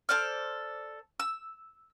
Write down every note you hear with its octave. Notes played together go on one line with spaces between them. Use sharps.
A4 C5 D5 F6
E6